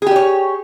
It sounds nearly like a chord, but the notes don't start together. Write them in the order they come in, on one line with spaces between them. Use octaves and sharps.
G#4 G4 D5 C#5